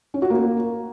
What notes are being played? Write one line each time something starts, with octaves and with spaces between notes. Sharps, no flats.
C#4
F#4
A#3